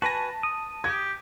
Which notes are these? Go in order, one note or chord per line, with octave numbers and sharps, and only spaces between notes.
F#4 B4 G#5 A5 A#6
D#6
G4 G#6